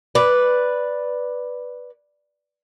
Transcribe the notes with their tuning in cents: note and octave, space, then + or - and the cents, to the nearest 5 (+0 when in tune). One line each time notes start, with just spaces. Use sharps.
B4 +0 D5 +0